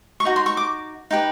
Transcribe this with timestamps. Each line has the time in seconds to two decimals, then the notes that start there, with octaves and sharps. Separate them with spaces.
0.20 C#6
0.25 D#4 F#4
0.36 C6
0.46 C#6
0.57 D6
1.11 D#4 G4 B4